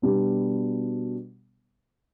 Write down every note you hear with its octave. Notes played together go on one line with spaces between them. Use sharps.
B2 G3 B3 D4